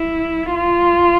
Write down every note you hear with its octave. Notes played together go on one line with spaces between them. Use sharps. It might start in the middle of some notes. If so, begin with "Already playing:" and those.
Already playing: E4
F4